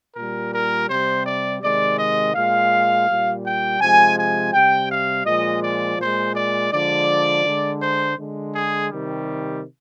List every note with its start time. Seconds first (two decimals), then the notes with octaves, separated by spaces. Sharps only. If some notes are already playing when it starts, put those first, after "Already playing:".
0.16 A#2 G3 A#4
0.52 A#4
0.89 C3 G3 C5
1.26 D5
1.62 C3 D#3 G#3 D5
1.98 D#5
2.35 A#2 G#3 F5
3.07 A#2 G3
3.44 G5
3.80 C3 F3 G#3 G#5
4.17 G#5
4.53 C3 G3 G5
4.90 F5
5.26 A#2 F3 G#3 D#5
5.63 D5
5.99 A#2 G#3 C5
6.36 D5
6.72 D3 F3 G#3 D5
7.45 D3 G#3
7.82 C5
8.18 D3 G#3
8.54 G#4
8.91 C3 D#3 G3